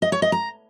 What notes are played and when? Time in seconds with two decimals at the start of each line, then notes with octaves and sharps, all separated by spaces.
0.02 D#5
0.12 C#5
0.22 D#5
0.32 A#5